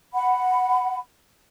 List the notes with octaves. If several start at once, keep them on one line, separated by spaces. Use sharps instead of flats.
F#5 B5